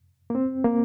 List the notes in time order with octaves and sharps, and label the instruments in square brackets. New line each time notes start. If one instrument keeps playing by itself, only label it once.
[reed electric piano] A#3
C4
A#3